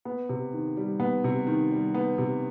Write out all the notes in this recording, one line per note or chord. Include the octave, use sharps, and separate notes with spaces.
B3
C3
D#3
G3
B3
C3
D#3
G3
B3
C3